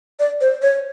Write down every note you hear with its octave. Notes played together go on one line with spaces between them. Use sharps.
D5
C5
C#5